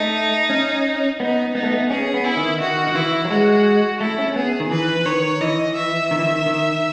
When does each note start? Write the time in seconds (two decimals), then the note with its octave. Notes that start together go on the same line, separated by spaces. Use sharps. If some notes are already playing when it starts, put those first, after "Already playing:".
Already playing: A3 D#4
0.50 C#4
1.20 B3 D#4
1.55 B3 D#4
1.63 A3
1.71 B3
1.90 C#4 G#4
2.14 B3
2.25 E4
2.37 D#3
2.60 D#3 F#4
2.87 D#3
2.95 E3 E4
3.25 F#3
3.31 G#3 F#4
4.00 A3 E4
4.18 C#4
4.36 B3 G#4
4.60 D#3
4.71 E3 B4
5.06 D#3 C#5
5.41 E3 D#5
5.76 E5
6.11 D#3
6.19 E3
6.26 D#3
6.46 D#3